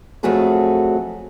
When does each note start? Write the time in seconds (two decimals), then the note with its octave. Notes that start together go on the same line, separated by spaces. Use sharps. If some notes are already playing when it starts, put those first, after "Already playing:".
0.23 F2 F#3 A3 F#4 G#4 A4